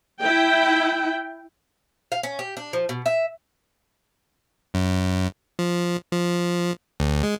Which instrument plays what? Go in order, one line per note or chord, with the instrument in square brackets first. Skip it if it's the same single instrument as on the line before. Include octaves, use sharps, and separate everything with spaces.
[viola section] E4 G5
[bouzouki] F5
C#4
G4
D4
F3
B2
E5
[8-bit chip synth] F#2
F3
F3
D2
G#3